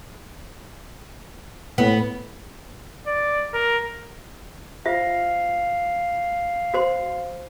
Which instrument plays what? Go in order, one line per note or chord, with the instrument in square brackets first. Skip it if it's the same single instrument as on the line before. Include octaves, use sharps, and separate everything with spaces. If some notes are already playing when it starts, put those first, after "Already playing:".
[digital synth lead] A2 [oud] B3
[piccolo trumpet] D5
A#4
[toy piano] F4 C5 E5 [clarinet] F5
[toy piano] F#4 C5 C6